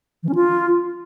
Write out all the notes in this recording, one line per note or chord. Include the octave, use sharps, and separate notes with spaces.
E3
C#4
F4